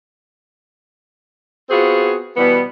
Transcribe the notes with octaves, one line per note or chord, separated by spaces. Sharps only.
B3 C4 F4 F#4 G#4
B2 E3 G3 B3